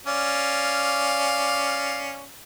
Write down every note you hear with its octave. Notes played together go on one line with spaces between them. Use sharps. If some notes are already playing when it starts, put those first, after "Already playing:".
C#4 D5 F5